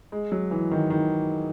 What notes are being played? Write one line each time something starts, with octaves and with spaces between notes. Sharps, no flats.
G#3
F#3
E3
D#3
D#3